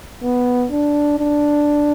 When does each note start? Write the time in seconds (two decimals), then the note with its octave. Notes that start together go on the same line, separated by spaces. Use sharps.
0.23 B3
0.71 D4
1.19 D4